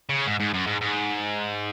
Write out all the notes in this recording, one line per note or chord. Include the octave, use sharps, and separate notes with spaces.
C#3
G#2
G#2
F#2
G#2
G#2